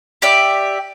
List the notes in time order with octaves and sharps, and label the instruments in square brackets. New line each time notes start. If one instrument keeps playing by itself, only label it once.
[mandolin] G4 D5 E5